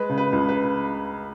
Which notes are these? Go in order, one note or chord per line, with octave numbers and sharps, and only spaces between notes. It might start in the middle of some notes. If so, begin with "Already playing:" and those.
Already playing: G#3 B4
C#3
B4
C#2
B4